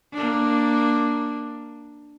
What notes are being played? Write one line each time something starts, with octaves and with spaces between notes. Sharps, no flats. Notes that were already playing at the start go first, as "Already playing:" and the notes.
A#3 D4